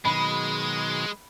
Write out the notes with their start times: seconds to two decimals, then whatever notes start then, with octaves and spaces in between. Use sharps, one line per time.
0.05 B2 D#3 F#3 G#3 B5